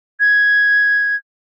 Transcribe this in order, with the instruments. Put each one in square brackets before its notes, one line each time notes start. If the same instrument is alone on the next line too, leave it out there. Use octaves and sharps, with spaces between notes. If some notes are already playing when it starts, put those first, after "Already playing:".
[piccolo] G#6